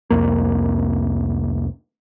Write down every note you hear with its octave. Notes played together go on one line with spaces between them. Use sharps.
C2 F2 A#3